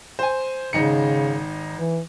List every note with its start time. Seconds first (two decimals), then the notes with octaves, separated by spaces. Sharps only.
0.19 C5 G#5
0.73 G#1 C#3 D#4 C#7
1.75 E3